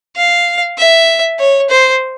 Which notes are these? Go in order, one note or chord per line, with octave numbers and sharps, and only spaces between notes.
F5
E5
C#5
C5